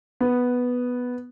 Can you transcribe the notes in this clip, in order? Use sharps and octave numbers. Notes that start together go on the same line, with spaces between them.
B3